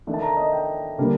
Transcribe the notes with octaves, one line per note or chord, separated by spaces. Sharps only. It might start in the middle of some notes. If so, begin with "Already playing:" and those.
D#3 A3 D4
A5
A#5
D#5
G5
D3 G3 A#3 D4